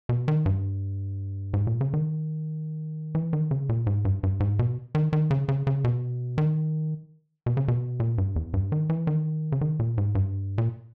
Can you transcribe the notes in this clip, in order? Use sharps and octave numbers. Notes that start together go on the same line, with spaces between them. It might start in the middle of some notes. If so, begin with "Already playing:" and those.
B2
D#3
G2
G#2
A#2
C#3
D#3
E3
D#3
C#3
A#2
G#2
G2
G2
G#2
B2
D#3
D#3
C#3
C#3
C#3
B2
D#3
B2
C#3
B2
A#2
G2
E2
G2
D#3
E3
D#3
C#3
D#3
A#2
G#2
G2
A#2